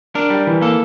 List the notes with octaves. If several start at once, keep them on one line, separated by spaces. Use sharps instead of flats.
D4 A#4
G3
E3
A#3 A4